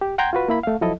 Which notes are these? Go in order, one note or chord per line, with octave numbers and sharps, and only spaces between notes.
G4
F#5 G5 A#5 C6 G6 G#6
F4 F#4 B4
A#3 E4 B5
A3 F5
F3 F#3 E4 A4 D#5